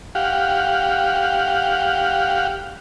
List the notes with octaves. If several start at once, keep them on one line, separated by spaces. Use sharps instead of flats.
G4 F5 F#5